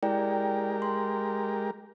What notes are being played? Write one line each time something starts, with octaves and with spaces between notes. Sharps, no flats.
G#3 E4 G4 A#4 D5 G5
C6